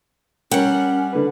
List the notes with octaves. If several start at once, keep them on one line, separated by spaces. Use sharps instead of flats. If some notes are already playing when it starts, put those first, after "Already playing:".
G3 C#4 A#4 C#5 F#5 G5
D3 B4